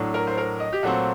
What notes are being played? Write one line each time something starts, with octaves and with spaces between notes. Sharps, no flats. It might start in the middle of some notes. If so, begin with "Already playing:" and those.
Already playing: A2 F#3 A3 D4
A#4
C5
A#4
D#5
G4
A#2 F#3 A3 C4 F#4